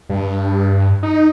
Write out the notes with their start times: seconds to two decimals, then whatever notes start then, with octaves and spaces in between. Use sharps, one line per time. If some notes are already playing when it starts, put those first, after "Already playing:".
0.09 G2
1.03 D#4